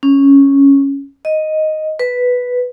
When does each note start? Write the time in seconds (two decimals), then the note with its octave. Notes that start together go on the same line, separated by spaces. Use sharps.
0.03 C#4
1.25 D#5
1.99 B4